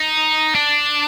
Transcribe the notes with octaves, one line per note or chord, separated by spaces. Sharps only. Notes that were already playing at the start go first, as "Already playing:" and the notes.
Already playing: D#4
D4